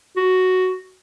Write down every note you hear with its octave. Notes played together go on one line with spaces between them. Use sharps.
F#4